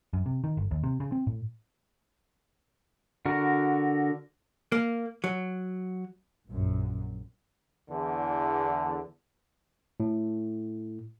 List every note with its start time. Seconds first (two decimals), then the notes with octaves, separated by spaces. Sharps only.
0.13 F#2
0.26 C3
0.44 D#3
0.57 G1
0.71 D#2
0.84 C3
1.00 C#3
1.12 C4
1.27 A2
3.26 D3 F#4 A#4
4.72 A#3
5.24 F#3
6.47 A#1 F#2
7.90 E2 D3
10.00 A2